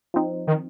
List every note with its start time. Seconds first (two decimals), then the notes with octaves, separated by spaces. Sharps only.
0.14 F3 C4 D#4
0.47 D#3